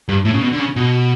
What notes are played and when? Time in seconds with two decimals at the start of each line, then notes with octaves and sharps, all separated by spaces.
0.09 G2
0.25 A2
0.34 C#3
0.42 B2
0.53 D3
0.60 C#3
0.76 B2